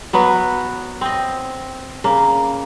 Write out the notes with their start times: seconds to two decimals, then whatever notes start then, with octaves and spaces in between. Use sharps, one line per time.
0.13 F#3 B3 F#4 B4
1.01 C4 D#5
2.04 C#3 A#3